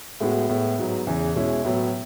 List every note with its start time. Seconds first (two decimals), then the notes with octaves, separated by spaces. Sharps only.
0.20 A2 G#3 B3 F#4
0.49 A2 G#3 B3
0.78 G#2 F#3 B3
1.07 E2 C#3 E3
1.35 B2 G#3 C#4 E4
1.65 A2 F#3 B3